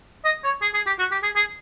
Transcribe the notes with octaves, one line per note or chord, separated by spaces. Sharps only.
D#5
C#5
G#4
G#4
G4
F#4
G4
G#4
G#4